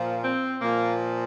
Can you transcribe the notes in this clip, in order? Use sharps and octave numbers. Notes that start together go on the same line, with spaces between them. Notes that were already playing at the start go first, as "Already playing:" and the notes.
Already playing: A#2 F3
C4
A#2 F3 A#3